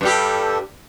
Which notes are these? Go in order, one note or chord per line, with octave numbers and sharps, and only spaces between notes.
G2 G3 G4 A4